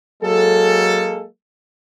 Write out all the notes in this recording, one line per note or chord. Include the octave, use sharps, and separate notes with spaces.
F#3 G#3 A#3 G#4 A4